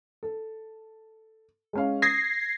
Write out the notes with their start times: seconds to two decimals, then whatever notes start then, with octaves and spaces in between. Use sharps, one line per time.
0.23 A4
1.73 G#3 C#4 F5
2.02 D#6 G#6 A#6 C7